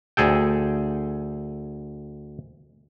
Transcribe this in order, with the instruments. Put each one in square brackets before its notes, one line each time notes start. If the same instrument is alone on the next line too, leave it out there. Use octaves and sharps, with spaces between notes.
[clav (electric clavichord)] D2 G#4 A4 G5